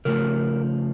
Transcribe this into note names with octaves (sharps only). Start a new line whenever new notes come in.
C#3 F3 A3 A#4